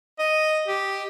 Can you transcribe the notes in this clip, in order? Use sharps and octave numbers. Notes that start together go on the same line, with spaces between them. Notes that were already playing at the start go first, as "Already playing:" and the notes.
D#5
G4